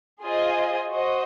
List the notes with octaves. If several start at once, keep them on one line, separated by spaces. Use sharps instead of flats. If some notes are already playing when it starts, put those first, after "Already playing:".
F4 G#4 C5 D#5 G#5
F#4 C5 D#5